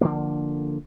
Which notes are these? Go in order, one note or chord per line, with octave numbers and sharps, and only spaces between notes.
D3 F3 A#3